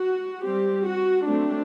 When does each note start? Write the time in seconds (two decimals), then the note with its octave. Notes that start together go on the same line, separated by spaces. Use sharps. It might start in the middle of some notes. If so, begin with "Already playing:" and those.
Already playing: F#4
0.44 G3 C4 G4
0.85 F#4
1.25 F#3 A3 C4 D4